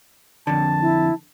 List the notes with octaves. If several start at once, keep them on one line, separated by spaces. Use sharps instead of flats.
F2 D3 A5
E4